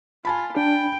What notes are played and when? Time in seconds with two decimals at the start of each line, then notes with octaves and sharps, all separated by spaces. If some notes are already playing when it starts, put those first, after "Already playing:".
0.25 F4 G#5 A5 B5
0.56 D4 G5